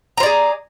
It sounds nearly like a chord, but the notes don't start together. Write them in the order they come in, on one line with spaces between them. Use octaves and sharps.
A#5 C5 D5 G#4